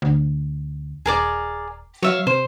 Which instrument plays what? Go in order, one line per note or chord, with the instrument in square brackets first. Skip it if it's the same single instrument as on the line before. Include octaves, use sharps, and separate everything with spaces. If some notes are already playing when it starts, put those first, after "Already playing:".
[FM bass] D2
[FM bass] D#1 [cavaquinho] G#4 A#4 D5
[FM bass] F#3 [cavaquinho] C#5 E5 F5
[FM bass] C3 [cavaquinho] C5